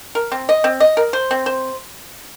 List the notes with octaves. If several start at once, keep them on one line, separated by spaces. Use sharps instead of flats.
A#4
C4
D#5
C4
D#5
A#4
C5
C4
C5